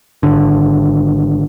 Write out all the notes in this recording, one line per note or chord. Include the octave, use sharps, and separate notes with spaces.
G#1 D3